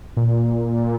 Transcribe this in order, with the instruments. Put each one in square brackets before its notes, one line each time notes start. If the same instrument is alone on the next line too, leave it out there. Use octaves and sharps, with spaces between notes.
[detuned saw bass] A#2